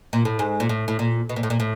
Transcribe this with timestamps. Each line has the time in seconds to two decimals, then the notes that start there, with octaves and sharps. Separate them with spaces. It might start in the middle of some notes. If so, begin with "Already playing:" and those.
0.13 A#2
0.25 A2
0.39 G#2
0.60 A#2
0.69 A2
0.88 A2
0.99 A#2
1.29 B2
1.36 A#2
1.43 A2
1.50 A#2
1.60 A2